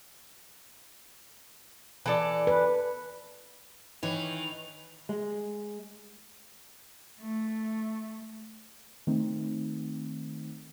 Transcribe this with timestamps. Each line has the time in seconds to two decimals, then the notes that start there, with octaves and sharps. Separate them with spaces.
2.06 E3 A4 D5
2.47 B4
4.03 D#3 E3 D#4 C#5 F7
5.09 G#3
7.21 A3
9.07 D#3 A3 C4 D#4